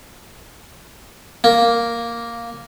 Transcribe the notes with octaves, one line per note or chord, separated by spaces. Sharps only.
A#3